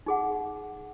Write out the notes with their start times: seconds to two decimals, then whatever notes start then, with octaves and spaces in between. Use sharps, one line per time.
0.06 D#4 G#4 F#5